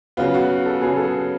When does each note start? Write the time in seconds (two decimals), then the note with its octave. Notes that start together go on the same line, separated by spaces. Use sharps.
0.17 C#3 F#3 B3 F4
0.34 F#4
0.66 A4
0.81 C#3 F#3 B3 G#4
0.97 A4
1.04 G#4